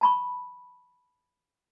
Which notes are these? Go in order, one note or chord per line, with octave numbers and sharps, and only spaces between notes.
A5 B5 C#6